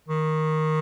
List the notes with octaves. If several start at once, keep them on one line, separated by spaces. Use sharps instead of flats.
D#3